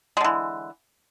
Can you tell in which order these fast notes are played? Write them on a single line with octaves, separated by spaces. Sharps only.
G#3 D3 E3